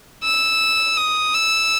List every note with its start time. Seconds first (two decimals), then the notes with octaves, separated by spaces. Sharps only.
0.24 E6
0.97 D#6
1.34 E6